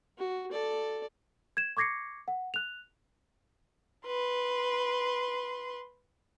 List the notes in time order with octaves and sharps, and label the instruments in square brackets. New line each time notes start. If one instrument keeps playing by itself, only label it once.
[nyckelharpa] F#4
A4 D5
[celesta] G#6 E7
C#6 D6 G#6 A#6 C7 C#7
F#5
F#6 F7
[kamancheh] B4 C6